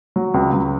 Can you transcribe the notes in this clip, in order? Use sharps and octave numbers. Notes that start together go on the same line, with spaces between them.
F#3
C#2
C#2